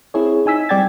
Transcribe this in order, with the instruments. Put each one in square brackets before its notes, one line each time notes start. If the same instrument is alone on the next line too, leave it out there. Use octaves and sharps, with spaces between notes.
[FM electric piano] C4 E4 G#4 C#5
D#4 G#5 E6 B6
G3 C4 D5 G5 G#6 A6